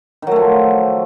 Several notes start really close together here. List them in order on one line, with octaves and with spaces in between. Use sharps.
D#3 F#3 A3 F3